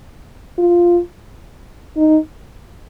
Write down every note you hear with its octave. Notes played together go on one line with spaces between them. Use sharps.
F4
D#4